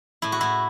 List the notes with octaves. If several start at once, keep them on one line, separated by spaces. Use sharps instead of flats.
A2 E4
F#4
A2 E4